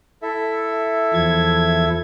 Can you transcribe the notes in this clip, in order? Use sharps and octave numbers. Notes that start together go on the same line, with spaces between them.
E4 A4 E5
E2 F3 G#6